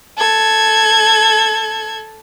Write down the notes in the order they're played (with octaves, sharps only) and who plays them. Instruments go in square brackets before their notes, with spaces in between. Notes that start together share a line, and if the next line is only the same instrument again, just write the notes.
[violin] A4 G#6